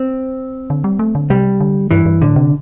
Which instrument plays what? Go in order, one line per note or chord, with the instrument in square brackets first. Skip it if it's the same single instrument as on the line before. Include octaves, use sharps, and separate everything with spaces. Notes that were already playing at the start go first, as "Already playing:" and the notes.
Already playing: [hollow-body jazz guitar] C4
[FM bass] D3
G3
A3
D3
[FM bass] C3 [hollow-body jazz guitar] G3
[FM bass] D3
[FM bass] G2 [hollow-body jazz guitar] E3
[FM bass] G2
[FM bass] A2 [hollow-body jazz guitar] D3
[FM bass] C3